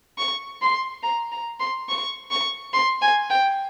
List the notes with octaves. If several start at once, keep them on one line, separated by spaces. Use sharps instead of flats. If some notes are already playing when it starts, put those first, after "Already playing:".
C#6
C6
A#5
A#5
C6
C#6
C#6
C6
G#5
G5